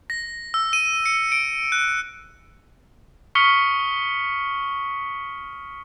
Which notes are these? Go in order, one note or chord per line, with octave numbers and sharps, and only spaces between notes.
A#6
E6
D#7
C#7
D7
F#6
C#6 D#6 F6 B6 C#7 G7